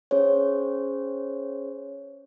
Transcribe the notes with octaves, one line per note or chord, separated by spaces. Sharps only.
C#4 G#4 C5 C#5